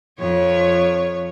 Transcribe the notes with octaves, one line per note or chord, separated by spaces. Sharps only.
F2 C#5